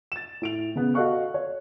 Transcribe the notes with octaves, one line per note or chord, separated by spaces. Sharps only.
A6 E7
A2 D7 F7
C#3 B3
F#4 A4 D#5 F5 C#6 F#6
C#5